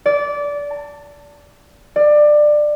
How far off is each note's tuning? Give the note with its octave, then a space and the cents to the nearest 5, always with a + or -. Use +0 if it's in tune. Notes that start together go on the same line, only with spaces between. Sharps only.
D5 -20
A5 +20
D5 +20